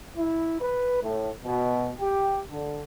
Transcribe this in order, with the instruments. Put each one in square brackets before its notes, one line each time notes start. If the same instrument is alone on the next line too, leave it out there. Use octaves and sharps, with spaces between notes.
[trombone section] E4
B4
A2
B2
G4
D3